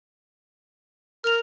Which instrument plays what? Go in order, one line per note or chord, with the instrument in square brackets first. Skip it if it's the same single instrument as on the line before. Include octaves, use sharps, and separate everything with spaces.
[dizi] A#4 [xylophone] F6 F7